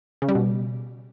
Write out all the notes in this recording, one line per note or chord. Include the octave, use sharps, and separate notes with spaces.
C#3
G3
B2